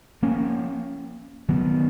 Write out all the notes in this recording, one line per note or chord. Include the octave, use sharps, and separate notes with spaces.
F3 A#3 C#4
D#3 F#3 B3